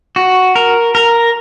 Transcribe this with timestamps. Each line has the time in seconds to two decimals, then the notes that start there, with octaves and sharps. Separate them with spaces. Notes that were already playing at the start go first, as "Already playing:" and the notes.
0.16 F#4
0.56 A#4
0.95 A#4